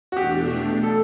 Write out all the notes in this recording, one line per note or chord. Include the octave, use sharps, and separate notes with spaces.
F#4
E2 B2 A3 D4 G4
A4